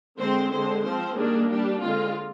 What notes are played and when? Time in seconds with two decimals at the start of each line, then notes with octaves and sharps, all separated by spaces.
0.18 D3 G#3 C4 C5
0.52 D3 G#3 C4 C5
0.84 F3 C4 C5
1.17 D#3 G3 A#3 D4 G#4
1.50 G3 D4 G4
1.83 D3 G#3 C4 F4